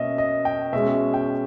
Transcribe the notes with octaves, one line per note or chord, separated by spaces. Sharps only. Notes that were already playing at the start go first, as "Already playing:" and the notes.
Already playing: B2 A#3 C#4 D#5 E5
D#5
G5
B2 G#3 C#4 E5
G5